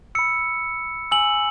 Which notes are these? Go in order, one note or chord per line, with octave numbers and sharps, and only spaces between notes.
B5 E6 C#7
G#5 E6 F#7